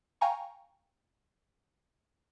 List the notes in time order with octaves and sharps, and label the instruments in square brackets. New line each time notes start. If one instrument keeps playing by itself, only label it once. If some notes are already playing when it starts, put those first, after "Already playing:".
[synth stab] F5 G5 G#5 A#5 C#6